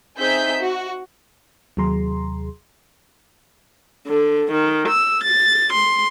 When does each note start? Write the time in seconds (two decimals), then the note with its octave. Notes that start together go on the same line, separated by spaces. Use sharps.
0.19 C4 D#4 G#4 E5 G6 B6
0.60 F#4
1.77 D#2 C3 F#3 G#4 A#5 C6
4.08 D3
4.52 D#3
4.89 E6
5.24 A6
5.73 C6